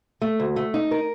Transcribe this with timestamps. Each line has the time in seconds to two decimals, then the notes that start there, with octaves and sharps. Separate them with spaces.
0.22 A3
0.39 D2
0.56 A3
0.74 D#4
0.91 A#4